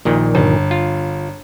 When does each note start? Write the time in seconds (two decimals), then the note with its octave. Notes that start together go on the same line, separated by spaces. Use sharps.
0.05 A#1 A#2 D#3
0.35 G1
0.71 F4